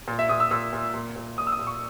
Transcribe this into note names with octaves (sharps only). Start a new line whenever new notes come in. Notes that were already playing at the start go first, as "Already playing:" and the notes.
A#2
E5
A#2 D#6
E6
A#2 E6
A#2
A#2
A#2
A#2 D#6
E6
D#6
A#2
C#6